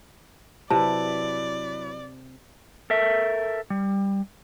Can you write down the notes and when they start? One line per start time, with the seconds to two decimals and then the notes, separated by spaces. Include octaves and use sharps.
0.70 C3 F#3 E4 B4 D5 A5
2.90 A4 A#4 E5
3.70 G3